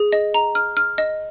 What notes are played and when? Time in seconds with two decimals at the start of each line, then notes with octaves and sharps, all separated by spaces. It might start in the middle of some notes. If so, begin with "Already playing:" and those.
Already playing: G#4
0.13 D#5
0.34 A#5
0.55 F6
0.77 F6
0.98 D#5